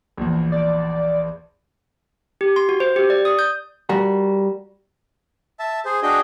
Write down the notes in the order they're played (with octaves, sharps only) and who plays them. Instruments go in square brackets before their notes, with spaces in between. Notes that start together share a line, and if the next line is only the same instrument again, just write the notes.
[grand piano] A#1 E2
[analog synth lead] D5
[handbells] G4
C6
F#4
C5
G4
D5
D#6
G6
[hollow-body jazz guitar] G3 F#4 A#4
[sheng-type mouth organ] E5 A5
G#4 C5
D4 F#4 G#4 D#5 G5